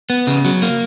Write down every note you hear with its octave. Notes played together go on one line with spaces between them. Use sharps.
B3
C#3
F#3
A#3